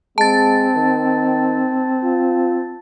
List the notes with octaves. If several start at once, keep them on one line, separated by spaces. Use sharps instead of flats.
G#3 C4 A5 A6
D#3
F4